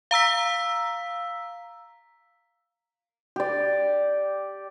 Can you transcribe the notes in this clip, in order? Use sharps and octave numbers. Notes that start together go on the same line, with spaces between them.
F5 A#5 E6 B6
G4 D5